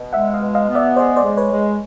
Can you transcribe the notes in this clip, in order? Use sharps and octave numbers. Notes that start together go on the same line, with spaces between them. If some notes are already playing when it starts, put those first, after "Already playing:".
Already playing: B2
G#3 E5 F#5
D#5 F5
B2
D#5 F5
B3
D5 E5
G#3 C5 D5
C5 D5
G#3
B4 C#5
G#3